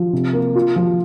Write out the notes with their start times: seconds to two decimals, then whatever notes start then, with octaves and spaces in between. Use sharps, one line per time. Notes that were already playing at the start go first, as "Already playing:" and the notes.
Already playing: F3
0.13 C3
0.33 A#3
0.55 F4
0.76 F3